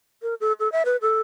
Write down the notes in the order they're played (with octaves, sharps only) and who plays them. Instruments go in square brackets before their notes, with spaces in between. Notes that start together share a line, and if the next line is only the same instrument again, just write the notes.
[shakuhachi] A#4
A4
A4
E5
B4
A4